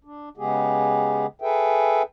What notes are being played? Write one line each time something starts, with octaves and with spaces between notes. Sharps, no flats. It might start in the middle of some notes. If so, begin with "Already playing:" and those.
D4
C#3 G#3 B3 G4 G#4
G#4 A4 B4 E5 G5